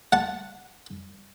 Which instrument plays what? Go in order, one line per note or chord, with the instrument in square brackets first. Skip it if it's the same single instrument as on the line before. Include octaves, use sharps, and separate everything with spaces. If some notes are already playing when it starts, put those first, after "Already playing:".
[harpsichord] F#5 A5